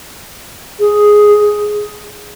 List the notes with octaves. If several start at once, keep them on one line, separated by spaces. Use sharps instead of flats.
G#4